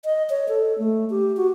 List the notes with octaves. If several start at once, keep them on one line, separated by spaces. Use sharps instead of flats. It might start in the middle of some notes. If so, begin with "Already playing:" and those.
D#5
C#5
A4
A3
G4
F#4